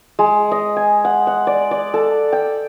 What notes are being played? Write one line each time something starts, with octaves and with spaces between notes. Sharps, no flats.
G#3
D#5
G#5
F#5
F#5
D5
D5
A4
G5